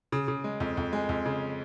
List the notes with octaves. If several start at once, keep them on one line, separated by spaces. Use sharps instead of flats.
C#3
C#3
G#3
F2
F2
G#3
F2
C#3